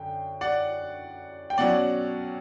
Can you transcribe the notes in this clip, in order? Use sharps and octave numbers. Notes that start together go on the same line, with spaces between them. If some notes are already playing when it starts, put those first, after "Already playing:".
Already playing: F#2 D3 G5
D5 F#5
G5
B2 F#3 C#4 D5 F#5